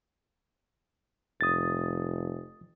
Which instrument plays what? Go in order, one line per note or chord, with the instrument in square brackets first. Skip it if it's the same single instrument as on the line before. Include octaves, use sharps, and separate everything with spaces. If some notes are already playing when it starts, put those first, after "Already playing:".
[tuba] F1 [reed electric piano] D#6 A6